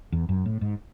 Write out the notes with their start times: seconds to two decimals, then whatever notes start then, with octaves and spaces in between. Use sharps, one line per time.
0.12 E2
0.29 F#2
0.46 A2
0.61 G#2